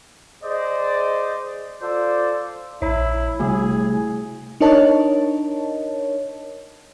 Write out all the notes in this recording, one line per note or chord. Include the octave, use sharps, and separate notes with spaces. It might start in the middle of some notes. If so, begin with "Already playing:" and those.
G#4 C5 D5 D#5
F4 A4 C5 D5
A#1 E4 C#5
C3 G3 A3 E4 G#4
D4 D#4 A#4 C#5 D#5 A5